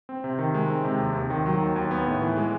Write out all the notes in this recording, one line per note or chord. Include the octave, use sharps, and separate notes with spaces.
C4
C3
D#3
G#3
C4
C3
D#2
D#2
D#3
F#3
D#2
D#2
B3
A2
E3
G#3